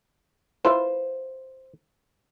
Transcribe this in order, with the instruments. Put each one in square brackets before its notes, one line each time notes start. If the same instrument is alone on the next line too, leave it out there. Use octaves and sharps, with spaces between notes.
[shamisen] E4 F4 B4 [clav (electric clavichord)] C5